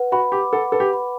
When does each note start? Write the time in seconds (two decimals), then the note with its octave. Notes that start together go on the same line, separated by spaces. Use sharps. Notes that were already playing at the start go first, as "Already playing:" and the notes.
Already playing: B4 F#5
0.12 F#4 B5
0.32 G4 D6
0.53 A4 F#5
0.72 A4 B4
0.80 G4
0.94 B5